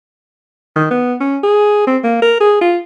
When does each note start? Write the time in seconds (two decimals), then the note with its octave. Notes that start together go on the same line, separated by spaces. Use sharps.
0.76 D#3
0.91 B3
1.20 C#4
1.43 G#4
1.87 C4
2.04 A#3
2.22 A#4
2.40 G#4
2.61 F4